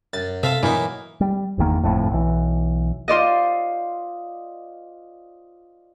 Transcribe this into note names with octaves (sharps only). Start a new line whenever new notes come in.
F#2 A6
C3 A4 E5 F5 A5
G2 B2 E3 F#3 A#3 D#4
G3
G1 E2 D#3 A#3
G1 F2 A2
B1 E3
F4 C5 D5 D#5